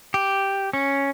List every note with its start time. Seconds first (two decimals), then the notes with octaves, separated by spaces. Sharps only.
0.14 G4
0.73 C#4